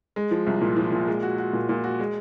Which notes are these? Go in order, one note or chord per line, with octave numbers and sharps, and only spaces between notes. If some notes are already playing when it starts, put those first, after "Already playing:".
G#3
F3
C2
A#2
F3
A#2
G#3
F#4
F#4
A#2
A#2
F#4
G#3